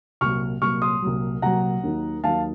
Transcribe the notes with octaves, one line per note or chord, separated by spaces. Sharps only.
C2 A#2 F#3 C#6 F6
C2 A#2 F#3 C#6 F6
C6 D#6
C2 A#2 F#3
C2 A#2 F#3 F#5 A#5
D#2 D#3 F#3
D#2 D#3 F#3 F5 A5